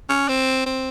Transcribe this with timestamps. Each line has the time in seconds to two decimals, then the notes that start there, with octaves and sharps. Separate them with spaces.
0.09 C#4
0.29 C4
0.66 C4